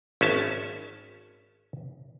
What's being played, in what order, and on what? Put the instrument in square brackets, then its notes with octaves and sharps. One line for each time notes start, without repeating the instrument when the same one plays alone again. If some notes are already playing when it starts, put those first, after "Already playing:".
[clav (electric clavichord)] G#1 C#4 E5 A5